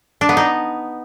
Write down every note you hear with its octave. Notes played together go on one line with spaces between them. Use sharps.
D4
B3
D#4